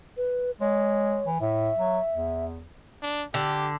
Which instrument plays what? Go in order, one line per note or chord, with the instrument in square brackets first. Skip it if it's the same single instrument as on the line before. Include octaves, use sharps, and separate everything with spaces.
[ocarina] B4
[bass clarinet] G#3 [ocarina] C#5
[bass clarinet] E3
[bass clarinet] A2 [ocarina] E5
[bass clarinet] F#3
E2
[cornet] D4
[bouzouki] D3 [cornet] G4